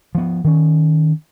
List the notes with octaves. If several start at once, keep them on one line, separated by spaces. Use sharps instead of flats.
F3 B3
D#3 C#4